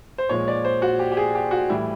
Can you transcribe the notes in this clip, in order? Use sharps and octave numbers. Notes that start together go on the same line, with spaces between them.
C5
A#2 F3 G#3 C#5
D5
C5
F#4
G4
G4
G#4
G4
F#4
A2 E3 G3 E4